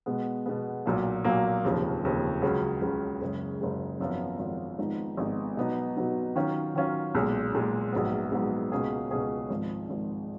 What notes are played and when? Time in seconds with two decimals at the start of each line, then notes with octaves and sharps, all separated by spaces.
0.06 B2 G#3 B3
0.46 B2 G#3 B3
0.86 B1 A#2 F#3 A#3
1.24 B1 A#2 F#3 A#3
1.64 F1 D#2 C#3 F3
2.03 F1 D#2 C#3 F3
2.42 C#2 C#3 F#3
2.82 C#2 C#3 F#3
3.21 F#1 F#2 C#3 G#3
3.61 F#1 F#2 C#3 G#3
4.00 G#1 F#2 F3 B3 F4
4.39 G#1 F#2 F3 B3 F4
4.79 G#1 G#2 F3 B3 D#4
5.17 G#1 G#2 F3 B3 D#4
5.57 B2 F#3 B3 D#4
5.97 B2 F#3 B3 D#4
6.36 D#3 F#3 C#4 F4
6.75 D#3 F#3 C#4 F4
7.15 B1 A#2 G#3
7.53 B1 A#2 G#3
7.93 A#1 G#2 F#3 B3
8.32 A#1 G#2 F#3 B3
8.72 C#2 B2 A#3 C#4 G#4
9.11 C#2 B2 A#3 C#4 G#4
9.50 G#1 G#2 F3
9.90 G#1 G#2 F3